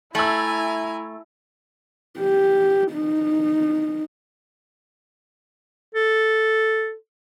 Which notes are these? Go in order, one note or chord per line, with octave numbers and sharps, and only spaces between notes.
A3 E4 G#5 A#5 E6 F#7
G4
D#4
A4